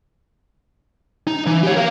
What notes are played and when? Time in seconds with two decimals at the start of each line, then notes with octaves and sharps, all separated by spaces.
1.27 D#4
1.46 E3
1.63 G4 C#5
1.76 A#4 F5